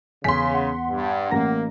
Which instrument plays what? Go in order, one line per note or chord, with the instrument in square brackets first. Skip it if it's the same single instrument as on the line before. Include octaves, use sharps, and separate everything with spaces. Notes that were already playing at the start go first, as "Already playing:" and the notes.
[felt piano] E2 [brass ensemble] C#3 [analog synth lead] G#5 [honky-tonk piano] C6 B6
[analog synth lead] F#5
[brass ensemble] G2
[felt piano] A1 A#5 A#6 [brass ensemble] A#3